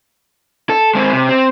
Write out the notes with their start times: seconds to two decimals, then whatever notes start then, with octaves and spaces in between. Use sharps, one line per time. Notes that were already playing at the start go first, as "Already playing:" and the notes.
0.69 A4
0.95 G#3 C4
1.13 C3
1.29 C4